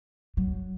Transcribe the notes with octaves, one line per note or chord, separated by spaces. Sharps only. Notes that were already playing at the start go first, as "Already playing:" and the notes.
F#3